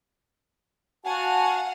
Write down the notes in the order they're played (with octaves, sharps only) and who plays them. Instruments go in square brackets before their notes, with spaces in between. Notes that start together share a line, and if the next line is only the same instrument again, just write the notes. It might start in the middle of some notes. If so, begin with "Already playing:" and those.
[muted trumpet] F#4 [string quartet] F5 F#5 [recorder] G#5 [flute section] A5